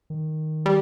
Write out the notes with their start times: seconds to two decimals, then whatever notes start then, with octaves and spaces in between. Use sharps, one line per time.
0.10 D#3
0.66 G3